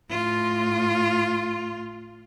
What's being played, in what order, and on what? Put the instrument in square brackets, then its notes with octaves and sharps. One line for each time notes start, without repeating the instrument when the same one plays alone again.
[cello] A2 F4